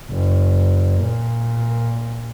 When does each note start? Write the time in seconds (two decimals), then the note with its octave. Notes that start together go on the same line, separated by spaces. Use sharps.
0.10 F#1
1.03 A#2